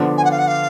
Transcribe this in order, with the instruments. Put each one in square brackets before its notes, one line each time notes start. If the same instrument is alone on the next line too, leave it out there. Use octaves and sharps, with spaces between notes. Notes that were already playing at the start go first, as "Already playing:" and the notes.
Already playing: [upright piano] D3 F3 B3 D4
[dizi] G#5
F#5
F5
F#5
F5